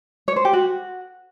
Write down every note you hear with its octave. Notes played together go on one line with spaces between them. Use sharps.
C#5
C5
G4
F#4